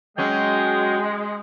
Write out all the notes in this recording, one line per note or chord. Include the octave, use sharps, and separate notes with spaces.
F#3 G#3 C#4 G5